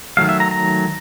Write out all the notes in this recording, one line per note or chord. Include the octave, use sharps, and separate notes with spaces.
D#3 F#3 A3 F5
E5
A#5
A#5